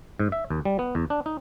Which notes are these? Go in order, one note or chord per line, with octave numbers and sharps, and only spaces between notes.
G#2
E5
D#2
G3
B3
E2
D4
D#4